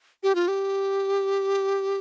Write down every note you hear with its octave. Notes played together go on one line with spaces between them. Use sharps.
G4
F4
G4